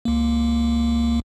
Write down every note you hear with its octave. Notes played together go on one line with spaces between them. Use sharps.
C#2 A#3